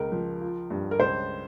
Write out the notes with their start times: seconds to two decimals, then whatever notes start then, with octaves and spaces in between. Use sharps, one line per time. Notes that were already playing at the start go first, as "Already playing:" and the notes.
Already playing: C#2 A#3 A#4
0.12 F3
0.41 F4
0.70 G2
0.91 A#4
0.99 C#2 C5